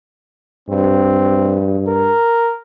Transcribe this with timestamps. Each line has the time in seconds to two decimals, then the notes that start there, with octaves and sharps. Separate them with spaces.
0.69 G2 C4
1.88 A#4